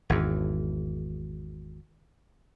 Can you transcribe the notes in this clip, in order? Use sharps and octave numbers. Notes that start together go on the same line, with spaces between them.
G#1 E2